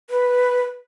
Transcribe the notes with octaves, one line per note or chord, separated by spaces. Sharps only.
B4